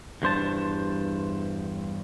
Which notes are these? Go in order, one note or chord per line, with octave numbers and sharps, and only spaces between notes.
E2 G2 C5 A5